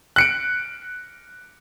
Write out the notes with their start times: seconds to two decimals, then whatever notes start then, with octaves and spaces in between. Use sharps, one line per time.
0.16 F#6 C#7 D7